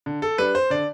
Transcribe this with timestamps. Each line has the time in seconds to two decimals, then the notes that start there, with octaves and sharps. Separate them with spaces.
0.06 D3
0.22 A4
0.38 G3 D4 B4
0.55 C5
0.70 D3 D5